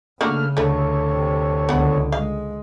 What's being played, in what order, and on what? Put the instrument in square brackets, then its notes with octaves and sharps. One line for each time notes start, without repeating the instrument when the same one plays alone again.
[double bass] C#3 [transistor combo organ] A3 F6 [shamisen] A#3 D4 F#4
[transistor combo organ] D2 A4 C#5 [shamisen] D3 A3
[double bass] C3
[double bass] C#2 D3 [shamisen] B3 F#5
[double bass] G#3 [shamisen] F5